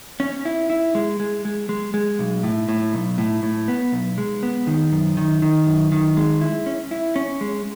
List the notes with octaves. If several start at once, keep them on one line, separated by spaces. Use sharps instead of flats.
C#4
E4
E4
G#3
G#3
G#3
G#3
G#3
B1
A2
A2
B1
A2
A2
B3
B1
G#3
B3
D#3
F#2
D#3
D#3
F#2
D#3
G#3
E4
C#4
E4
C#4
G#3